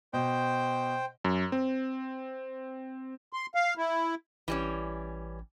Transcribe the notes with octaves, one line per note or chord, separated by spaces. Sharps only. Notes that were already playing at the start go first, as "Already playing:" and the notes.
B2 C5 G5
F#2
C4
C6
F5
E4
A1 E3 G3 C#4